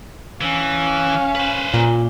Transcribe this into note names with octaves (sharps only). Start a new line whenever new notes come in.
E3 C#4 F5
B4 C5
A#2